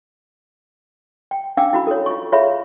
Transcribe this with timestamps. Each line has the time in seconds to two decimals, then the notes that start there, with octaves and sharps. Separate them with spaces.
1.31 G5
1.57 C#4 D4 F5 G5 D6 E6
1.73 E4 F#4 B5
1.87 A4 C#5
2.06 F4 C#6
2.32 F4 G#4 C#5 E5 F5 B5